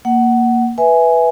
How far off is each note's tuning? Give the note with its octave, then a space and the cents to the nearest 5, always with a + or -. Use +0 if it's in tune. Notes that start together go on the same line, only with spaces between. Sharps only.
A#3 +0 F#5 +20
B4 +0 E5 -5 G#5 +0